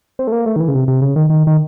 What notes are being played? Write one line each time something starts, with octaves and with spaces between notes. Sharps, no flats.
C4
A3
A#3
A3
D#3
E3
C#3
C3
C3
C#3
D#3
D#3
D#3